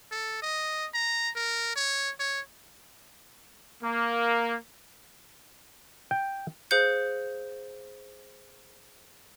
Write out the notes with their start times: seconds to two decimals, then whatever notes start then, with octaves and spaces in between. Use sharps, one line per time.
0.11 A4
0.42 D#5
0.94 A#5
1.35 A#4
1.76 C#5
2.19 C#5
3.83 A#3
6.11 G5
6.71 G#4 C5 F5 F#6 G6 C#7